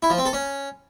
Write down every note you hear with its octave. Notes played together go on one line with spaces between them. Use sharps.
E4
F3
C4
A4
C#4